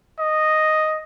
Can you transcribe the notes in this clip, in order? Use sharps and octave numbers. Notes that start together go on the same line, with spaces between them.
D#5